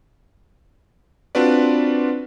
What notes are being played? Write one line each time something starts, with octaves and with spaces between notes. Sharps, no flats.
C4 D4 F4 F#4 B4 D5